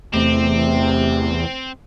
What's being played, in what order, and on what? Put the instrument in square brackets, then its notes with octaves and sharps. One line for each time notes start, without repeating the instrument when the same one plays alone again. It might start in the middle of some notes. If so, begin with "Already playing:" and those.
[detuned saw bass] E2 [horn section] C3 [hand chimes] A3 [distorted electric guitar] C4